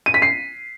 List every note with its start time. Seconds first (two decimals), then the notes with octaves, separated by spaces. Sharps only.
0.06 D#7
0.14 B6
0.22 C7